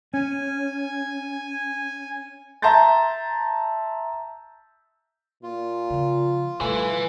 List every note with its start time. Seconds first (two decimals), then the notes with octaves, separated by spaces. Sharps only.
0.14 C#4 G#5
2.62 E5 A5 A#5 C6 G6 A6
5.43 A#2 F4
5.90 C#3 F3
6.61 B2 G3 A3 B4 G#5